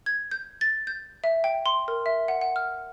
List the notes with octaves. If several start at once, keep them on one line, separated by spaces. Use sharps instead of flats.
G#6
G6
A6
G6
E5
G5
C6
A#4
E5
F#5
F#5
F6